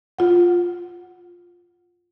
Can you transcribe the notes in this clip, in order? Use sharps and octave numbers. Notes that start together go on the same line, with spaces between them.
F4 F#5